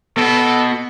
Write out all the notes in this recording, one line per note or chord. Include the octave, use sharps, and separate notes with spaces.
B2 B3 A4